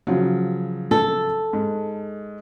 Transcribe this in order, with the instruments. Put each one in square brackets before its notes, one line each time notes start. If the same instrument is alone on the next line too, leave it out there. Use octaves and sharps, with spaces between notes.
[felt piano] C#3 F3 F#3
[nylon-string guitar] A4
[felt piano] G#2